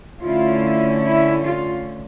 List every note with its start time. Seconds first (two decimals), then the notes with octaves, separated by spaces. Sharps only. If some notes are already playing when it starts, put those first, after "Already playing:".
0.21 D3 A3 C#4 E4 F4
1.04 E4
1.45 F4